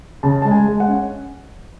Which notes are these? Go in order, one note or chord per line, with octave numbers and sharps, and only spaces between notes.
C#3 A5
G#3 A5
G#5
G#3
F#5
C#4